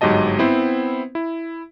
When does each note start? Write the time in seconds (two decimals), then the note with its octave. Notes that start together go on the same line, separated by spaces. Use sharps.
0.01 G1 G#2 F#3 G4 D#5 A5
0.39 B3 C4 E4 C5
1.15 E4